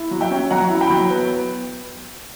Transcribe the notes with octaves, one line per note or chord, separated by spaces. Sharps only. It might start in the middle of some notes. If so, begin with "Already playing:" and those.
Already playing: E4
F#3
E5 G5
C#4
F#3 F#5 A#5
E4
G5 B5
F#3
B3